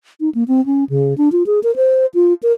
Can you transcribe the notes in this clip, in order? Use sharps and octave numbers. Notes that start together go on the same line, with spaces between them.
D#4
A#3
C4
C#4
C#3
D4
F4
G#4
A#4
C5
F4
A#4